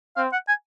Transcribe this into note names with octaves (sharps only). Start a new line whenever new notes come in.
C4 F5
F#5
G#5